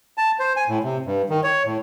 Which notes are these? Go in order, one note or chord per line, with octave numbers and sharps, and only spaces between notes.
A5
C5
G#5
A2
C3
G2
D#3
C#5
A2